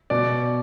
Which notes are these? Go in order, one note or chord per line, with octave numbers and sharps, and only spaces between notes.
B2 D5